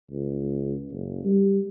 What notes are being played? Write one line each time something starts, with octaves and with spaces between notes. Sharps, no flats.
C#2
F#1
G3